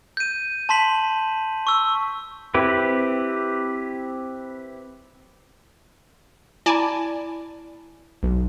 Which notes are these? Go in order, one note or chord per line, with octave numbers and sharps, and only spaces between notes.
G6 D#7
A5 C6 B6 F#7
C#6 E6
C4 E4 G4 B4
E4 D5 G#5 A5 B5
B1